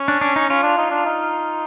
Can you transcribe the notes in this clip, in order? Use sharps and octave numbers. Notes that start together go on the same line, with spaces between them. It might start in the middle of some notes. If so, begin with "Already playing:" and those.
Already playing: C#4
D4
D4
D#4
C#4 F4
D4
D#4
D4
D#4